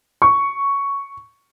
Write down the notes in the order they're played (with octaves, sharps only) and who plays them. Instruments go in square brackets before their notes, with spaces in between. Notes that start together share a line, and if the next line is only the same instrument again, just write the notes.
[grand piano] C#6